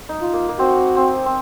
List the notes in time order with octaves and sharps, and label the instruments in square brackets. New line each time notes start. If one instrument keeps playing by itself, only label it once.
[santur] D#4
[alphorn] F4
[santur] A#3
A#3
[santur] C4 [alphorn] F#4
[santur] C4
C4